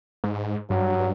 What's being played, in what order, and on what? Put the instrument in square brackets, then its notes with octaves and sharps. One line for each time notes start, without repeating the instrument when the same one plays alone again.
[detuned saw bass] G#2
[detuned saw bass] G2 [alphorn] F#3